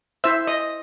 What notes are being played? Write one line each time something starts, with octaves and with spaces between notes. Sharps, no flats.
E4 C5 E5 E6
D#5 D#6